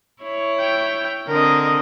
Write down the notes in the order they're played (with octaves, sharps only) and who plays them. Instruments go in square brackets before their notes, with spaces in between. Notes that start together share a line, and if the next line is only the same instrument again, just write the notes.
[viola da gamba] E4 C#5
[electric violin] G5
[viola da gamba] D3 C4 [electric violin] A#4 D#5